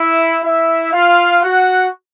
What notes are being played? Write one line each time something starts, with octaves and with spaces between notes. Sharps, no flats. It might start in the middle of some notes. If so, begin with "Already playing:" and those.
Already playing: E4 E5
E4 E5
F4 F5
F#4 F#5